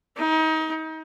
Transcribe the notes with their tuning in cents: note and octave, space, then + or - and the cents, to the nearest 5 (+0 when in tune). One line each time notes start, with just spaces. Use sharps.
D#4 +30